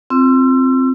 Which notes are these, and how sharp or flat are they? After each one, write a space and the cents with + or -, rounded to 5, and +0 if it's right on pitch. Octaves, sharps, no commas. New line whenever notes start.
C4 +0 F4 -10 E6 +30